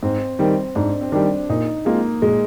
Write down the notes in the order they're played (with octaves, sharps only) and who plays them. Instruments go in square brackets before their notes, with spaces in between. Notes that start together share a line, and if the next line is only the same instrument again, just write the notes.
[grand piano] G#2 [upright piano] C4
[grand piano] D#3 G3 [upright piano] C4
[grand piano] G#2 [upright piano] D4
[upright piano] C4
[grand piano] D#3 G3 [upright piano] D4
[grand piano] A#2 [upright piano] D#4
[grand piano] G#3 C4 F4 G#4 [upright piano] A#3
[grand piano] A#2 [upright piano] G#3